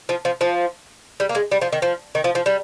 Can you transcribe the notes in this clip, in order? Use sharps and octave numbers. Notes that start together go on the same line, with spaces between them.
F3
F3
F3
G3
A#3
G#3
G3
F3
D#3
F3
D#3
F3
F3
G3